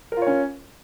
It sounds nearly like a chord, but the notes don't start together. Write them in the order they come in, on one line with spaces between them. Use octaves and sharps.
A#4 F4 C#5 C#4